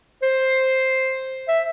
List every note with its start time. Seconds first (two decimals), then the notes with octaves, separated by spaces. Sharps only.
0.23 C5
1.48 E5